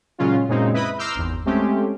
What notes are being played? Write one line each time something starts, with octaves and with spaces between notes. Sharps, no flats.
A#2 C#3 F#3 G#3 C#4 F4
F#2 A#2 C#3 G#3 C4 D#4
E4 B4 D#5 B5 D#6
A#5 C6 D6 E6 F6 G6
G#1 E2
G#3 A3 C4 C#4 G4